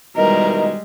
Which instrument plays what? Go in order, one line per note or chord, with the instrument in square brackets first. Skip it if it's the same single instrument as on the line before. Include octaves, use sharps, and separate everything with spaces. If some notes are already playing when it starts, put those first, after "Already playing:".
[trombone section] B2 D#3 E3 [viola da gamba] G3 G#3 [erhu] A#4 [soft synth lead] D#5